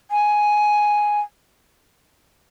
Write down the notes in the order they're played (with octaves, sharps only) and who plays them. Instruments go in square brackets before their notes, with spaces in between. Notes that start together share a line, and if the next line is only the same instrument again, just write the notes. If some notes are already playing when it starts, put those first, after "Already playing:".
[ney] G#5